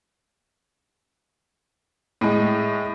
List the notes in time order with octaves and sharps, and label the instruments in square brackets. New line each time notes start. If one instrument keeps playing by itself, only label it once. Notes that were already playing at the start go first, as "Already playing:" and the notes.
[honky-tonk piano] A2 G#3